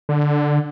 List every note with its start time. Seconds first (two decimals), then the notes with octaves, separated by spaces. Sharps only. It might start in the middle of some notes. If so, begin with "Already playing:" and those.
0.09 D3